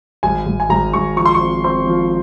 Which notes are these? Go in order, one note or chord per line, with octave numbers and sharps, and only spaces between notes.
G#1 G#5
G#1
G#5
G#1 A#5
G#1 C#6
F3 C#6
C6
C#6
C4
C4 C6
F3